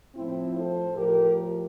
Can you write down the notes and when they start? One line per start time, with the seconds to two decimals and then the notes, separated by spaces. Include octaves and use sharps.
0.15 A2 F3 C4 E4
0.55 A4 C5
0.96 A2 F3 G4 A#4